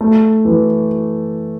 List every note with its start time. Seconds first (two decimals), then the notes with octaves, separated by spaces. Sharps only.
0.01 A3
0.45 E3